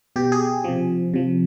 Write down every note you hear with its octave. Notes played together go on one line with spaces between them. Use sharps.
B2 G4
G#4
C3 F3
C3 F3